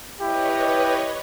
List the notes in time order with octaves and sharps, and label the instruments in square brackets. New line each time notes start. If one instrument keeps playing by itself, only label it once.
[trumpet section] E4 G4 [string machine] B4 C#5 D#5